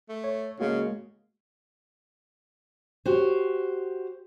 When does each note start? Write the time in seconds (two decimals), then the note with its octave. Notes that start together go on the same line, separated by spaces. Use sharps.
0.09 A3
0.24 C#5
0.60 C#3 G#3 A#3 F#4
3.05 F#4 G4 C5